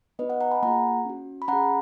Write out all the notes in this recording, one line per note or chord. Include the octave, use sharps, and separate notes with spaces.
B3 D#4 F#4 B4 D#5
D#5 F#5
F#5 A#5
G#5 B5
A#3 F4 G#4 F#5 A#5
C#4 F#4
B5
C#4 G#4 F#5 A#5